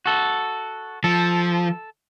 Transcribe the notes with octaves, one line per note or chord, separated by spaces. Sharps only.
F#4 A4
F3 A4